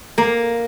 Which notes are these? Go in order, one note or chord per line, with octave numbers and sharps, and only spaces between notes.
A#3